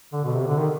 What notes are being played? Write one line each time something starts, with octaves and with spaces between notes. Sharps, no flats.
D3
B2
C3
D3
D#3